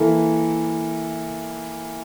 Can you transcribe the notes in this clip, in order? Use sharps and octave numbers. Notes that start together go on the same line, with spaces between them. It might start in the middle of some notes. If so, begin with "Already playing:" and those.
Already playing: E3 A#3 E4 A4